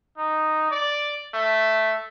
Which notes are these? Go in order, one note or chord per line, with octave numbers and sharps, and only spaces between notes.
D#4
D5
A3